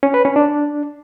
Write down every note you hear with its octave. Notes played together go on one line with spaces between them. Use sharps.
C#4
B4
C#4
D4